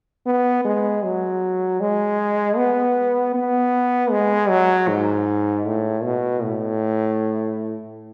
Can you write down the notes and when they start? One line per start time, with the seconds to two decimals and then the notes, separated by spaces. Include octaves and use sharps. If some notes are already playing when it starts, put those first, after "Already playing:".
0.26 B3
0.65 G#3
1.04 F#3
1.80 G#3
2.57 B3
3.34 B3
4.11 G#3
4.50 F#3
4.88 G#2
5.66 A2
6.04 B2
6.43 A2